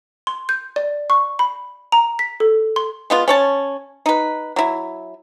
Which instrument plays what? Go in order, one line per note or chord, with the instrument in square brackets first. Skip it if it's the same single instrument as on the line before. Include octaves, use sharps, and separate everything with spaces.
[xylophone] C6
G6
D5
C#6
B5
A#5
B6
A4
C6
[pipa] G#3 B3 F4
C#4 C#5 A5
D#4 B4
F#3 E4